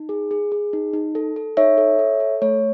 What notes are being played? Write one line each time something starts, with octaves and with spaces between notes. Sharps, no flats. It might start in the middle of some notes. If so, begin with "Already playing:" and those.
Already playing: D#4
G#4
G#4
G#4
D#4
D#4
A4
A4
D#4 C#5 E5
A4
A4
A4
A3 C#5